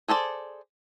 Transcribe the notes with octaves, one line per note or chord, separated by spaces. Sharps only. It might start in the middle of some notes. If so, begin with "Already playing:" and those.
G#4 A4 C5 D5